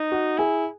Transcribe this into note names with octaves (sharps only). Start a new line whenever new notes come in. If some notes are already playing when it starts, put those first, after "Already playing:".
Already playing: D#4
F#4 F#5
E4 G#4 G#5